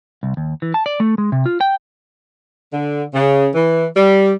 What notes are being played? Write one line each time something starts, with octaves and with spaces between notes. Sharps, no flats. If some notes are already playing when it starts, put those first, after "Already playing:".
C2
D#2
E3
A5
D5
A3
G#3
C3
F4
G5
D3
C#3
E3
G3